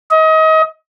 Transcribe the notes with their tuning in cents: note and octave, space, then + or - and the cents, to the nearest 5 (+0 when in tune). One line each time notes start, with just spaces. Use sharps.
D#5 +30